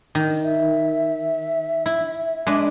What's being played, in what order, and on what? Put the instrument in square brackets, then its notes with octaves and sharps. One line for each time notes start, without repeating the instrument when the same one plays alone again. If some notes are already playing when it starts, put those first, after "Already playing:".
[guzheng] D#3
[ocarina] E5
[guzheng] E4
G#3 D4 B4